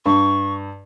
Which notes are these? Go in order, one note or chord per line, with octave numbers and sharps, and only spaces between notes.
G2 C#6